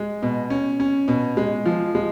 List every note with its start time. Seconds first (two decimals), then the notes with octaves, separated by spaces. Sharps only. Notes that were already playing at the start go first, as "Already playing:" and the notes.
Already playing: G#3
0.22 B2
0.50 C#4
0.80 C#4
1.08 B2
1.37 G#3
1.66 F3
1.95 G#3